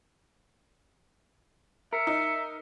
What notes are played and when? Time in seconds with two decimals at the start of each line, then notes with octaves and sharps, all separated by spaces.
1.93 A#4 E5 C#7
2.07 D#4